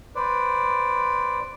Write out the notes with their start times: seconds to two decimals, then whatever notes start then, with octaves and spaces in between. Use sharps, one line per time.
0.15 B4 C5 D5